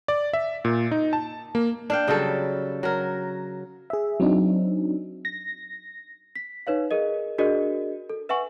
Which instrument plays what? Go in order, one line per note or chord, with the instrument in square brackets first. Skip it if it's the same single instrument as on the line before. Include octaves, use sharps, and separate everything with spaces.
[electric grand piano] D5
E5
A#2
D#4
A5
A#3
[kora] D4 F5 G5
C#3 F#3 G3 A4
F#3 A#4
[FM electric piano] G#4 E5
F#3 C4 D4 D#4
A#6
[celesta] B6
D#4 B4 C#5 F5
G#4 A#4 D#5
D4 F#4 G#4 A#4 D5 D#5
A4
B4 E5 F#5 G#5 C#6